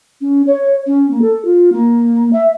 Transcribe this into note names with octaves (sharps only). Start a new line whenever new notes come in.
C#4
C#5
C#4
A#3
A4
F4
A#3
E5